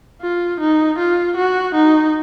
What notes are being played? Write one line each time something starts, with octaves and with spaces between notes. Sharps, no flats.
F4
D#4
F4
F#4
D#4